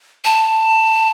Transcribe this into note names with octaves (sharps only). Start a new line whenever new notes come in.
A5